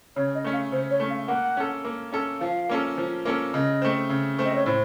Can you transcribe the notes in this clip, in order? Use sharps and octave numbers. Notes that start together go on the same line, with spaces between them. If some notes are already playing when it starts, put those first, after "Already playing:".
C#3 C#5
D#5
A3 C#4
F5
C#3 C5
C#5
A3 C#4
F5
A#3 F#5
C#4 A4
A#3
C#4 A4
F3 F5
A#3 C#4 A4
F3
A#3 C#4 A4
C#3 D#5
A3 C4
C#3
A3 C4
D#5
C#5
A2 C5